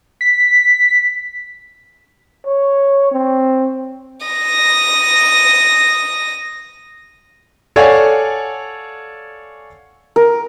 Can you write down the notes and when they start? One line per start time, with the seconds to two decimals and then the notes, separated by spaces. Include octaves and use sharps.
0.21 B6
2.46 C#5
3.12 C4
4.26 D#6 A#6
7.76 A4 C#5 D5 F5 F#5 G#5
10.16 A#4